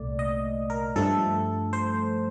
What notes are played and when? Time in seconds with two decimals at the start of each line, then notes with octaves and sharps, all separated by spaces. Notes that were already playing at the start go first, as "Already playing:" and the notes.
Already playing: C2 A#2 A3 D5
0.19 D#5
0.70 A#4
0.96 G2 F3 A3 A4
1.73 C5